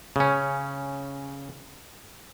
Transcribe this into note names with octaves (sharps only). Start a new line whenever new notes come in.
C#3 C#4